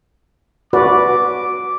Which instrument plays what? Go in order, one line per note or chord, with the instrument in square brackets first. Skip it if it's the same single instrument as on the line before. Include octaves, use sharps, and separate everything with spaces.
[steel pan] F#4 B4 D5 [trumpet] D6